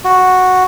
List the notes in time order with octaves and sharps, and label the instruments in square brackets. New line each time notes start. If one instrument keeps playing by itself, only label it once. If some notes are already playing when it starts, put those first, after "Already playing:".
[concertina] F#4